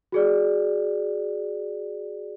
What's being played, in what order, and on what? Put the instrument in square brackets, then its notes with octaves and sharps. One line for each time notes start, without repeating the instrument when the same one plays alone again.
[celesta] F#4 G#4 D5